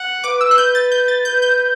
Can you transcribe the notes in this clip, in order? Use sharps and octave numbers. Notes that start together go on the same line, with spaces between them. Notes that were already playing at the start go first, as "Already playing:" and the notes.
Already playing: F#5
B4 D6
E6
F#6
G6
A6
G6
A6
B4 G6
G6